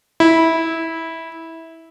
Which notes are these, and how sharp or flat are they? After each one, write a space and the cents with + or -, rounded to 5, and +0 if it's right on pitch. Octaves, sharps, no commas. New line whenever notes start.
E4 -15